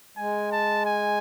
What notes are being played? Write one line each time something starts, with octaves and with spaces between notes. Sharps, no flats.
G#3 G#5
A5
G#5